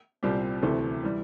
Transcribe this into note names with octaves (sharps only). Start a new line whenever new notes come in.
C2 A#2 G3 C4 G4
D2 C3 E3 A3
E3 G3